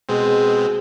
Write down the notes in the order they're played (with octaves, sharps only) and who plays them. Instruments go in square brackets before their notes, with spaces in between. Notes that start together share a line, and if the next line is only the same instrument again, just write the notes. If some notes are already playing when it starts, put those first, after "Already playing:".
[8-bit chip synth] B2 G#3 C4 [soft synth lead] G#4